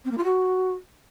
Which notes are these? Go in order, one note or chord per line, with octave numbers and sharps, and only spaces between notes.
C4
A#3
F4
F#4